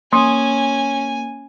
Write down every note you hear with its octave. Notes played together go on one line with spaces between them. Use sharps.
A#3 C#4 G#5 C6 D#6